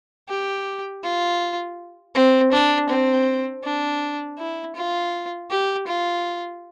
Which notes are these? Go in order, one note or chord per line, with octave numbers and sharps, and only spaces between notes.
G4
F4
C4
D4
C4
D4
E4
F4
G4
F4